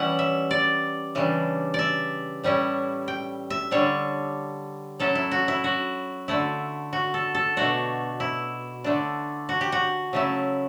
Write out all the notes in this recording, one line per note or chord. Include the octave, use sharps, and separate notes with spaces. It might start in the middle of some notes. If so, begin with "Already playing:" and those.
Already playing: E3 G3 C#4 E4 F#5
E5
D5
C#3 E3 G3 D4
D5 E5
A2 G3 C#4 E4
G5
E5
D3 G3 D4 C#5
F#3 C#4 E4 A4
E4
F#4
E4
F#4
D3 A3 E4
F#4
A4
A4
B2 A3 D4 F#4
E4
D3 A3 D4
F#4
G4
F#4
C#3 F#3 A3 E4